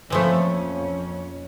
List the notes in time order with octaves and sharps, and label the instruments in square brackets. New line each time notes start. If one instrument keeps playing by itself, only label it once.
[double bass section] F2 A#3 C#4 [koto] E3 F3 A3